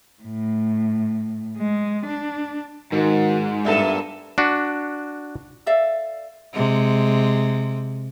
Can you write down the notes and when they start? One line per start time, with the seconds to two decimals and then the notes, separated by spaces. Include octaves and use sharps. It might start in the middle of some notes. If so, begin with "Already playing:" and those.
0.23 A2
1.57 G#3
2.06 D4
2.92 G#2 D#3 F#4
3.65 G2 A#2 B3 A4 E5
4.38 D4 F#4
5.66 A4 D5 E5 F5
6.54 C3 G#3